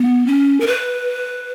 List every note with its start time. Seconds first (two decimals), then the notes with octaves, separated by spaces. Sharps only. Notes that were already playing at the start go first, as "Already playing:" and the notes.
Already playing: B3
0.27 C#4
0.60 A#4
0.67 B4